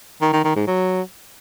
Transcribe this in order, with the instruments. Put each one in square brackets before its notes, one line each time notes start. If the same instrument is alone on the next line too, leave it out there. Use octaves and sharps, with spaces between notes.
[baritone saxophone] D#3
D#3
D#3
G#2
F#3